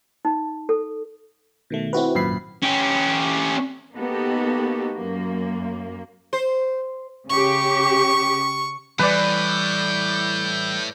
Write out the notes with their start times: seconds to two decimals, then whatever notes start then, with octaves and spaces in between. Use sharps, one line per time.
0.25 D#4
0.69 A4
1.70 B2 D#3 A3
1.93 C4 E4 F#4 B4
2.15 G#1 F#2 A#2 B5 C7
2.62 C#4 G4
3.95 A#3 B3 D#4 F#4 G4 A4
4.93 F#2 A#3
6.33 C5
7.30 C#3 G4 C#6
8.99 A2 E3 G3 B4 D5 G6